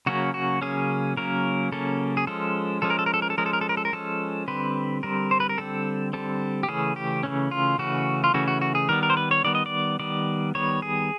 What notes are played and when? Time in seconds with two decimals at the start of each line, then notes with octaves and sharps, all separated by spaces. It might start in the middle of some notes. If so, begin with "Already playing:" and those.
0.06 C#3 F#3 A#3 C#4 F#4
0.34 F#4
0.61 C#3 F#3 A#3 C#4 G#4
1.17 C#3 F#3 A#3 C#4 A#4
1.72 C#3 F#3 A#3 C#4 A4
2.17 G#4
2.27 F3 G#3 C#4 A4
2.82 F3 G#3 C#4 A4
2.90 A#4
2.99 A4
3.06 A#4
3.14 A4
3.22 A#4
3.30 A4
3.38 F3 G#3 C#4 A#4
3.46 A4
3.53 A#4
3.61 A4
3.69 A#4
3.77 A4
3.85 A#4
3.93 F3 G#3 C#4 A4
4.48 D3 G3 C4 B4
5.03 D3 G3 C4 A#4
5.31 C5
5.40 B4
5.49 A#4
5.58 D3 G3 C4 A4
6.13 D3 G3 C4 A4
6.63 G4
6.68 C#3 E3 A3 C#4 G#4
6.96 G4
7.23 C#3 E3 A3 C#4
7.51 F4
7.78 C#3 E3 A3 C#4 F#4
8.24 F4
8.34 C#3 E3 A3 C#4 F#4
8.48 F#4
8.61 F#4
8.75 G#4
8.89 D#3 G3 B3 A#4
9.03 A#4
9.10 C5
9.17 B4
9.31 C#5
9.44 D#3 G3 B3 D5
9.55 D#5
9.66 D5
10.00 D#3 G3 B3 D5
10.55 D#3 G3 B3 C#5
10.82 G#4